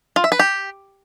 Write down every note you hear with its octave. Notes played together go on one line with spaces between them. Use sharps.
F4
E5
B4
G4